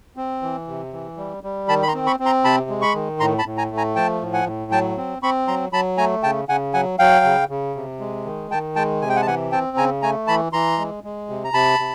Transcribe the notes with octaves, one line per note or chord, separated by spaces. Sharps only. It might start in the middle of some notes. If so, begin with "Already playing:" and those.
C4
E3
C3
E3
G3
G3
D#3 A5 B5
B5
A#5 C6
C4
B5 C#6
C4
A#5 C6
C3 A5 B5
G#3
B5 C#6
D#3
A2 A#5 C6
A5 B5
A2
G#5 A#5
A3
G#5 A#5
F3 G5 A5
A2
F#5 G#5
A2
F#3 G5 A5
C4
C4 B5 C#6
F#3 A#5 C6
F#3 A5 B5
A3 G#5 A#5
C#3 G5 A5
C#3 F#5 G#5
F#3 F#5 G#5
F#3 F5 G5
C#3
C#3
C3
G#3
D#3
D#3 G5 A5
G#3 G5 A5
C3 G#5
G5
F#5 G#5
A5
E3 F#5 G#5
C4 G5 A5
C#3 G#5 A#5
A3 G#5 A#5
E3 A5 B5
E3 A#5 C6
G#3
G#3
C3
A#5
C3 A5 B5
C3